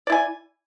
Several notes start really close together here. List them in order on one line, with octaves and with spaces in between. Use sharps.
D5 E4 G#5